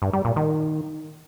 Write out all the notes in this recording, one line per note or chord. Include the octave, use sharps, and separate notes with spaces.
G2
G3
A#2
D#3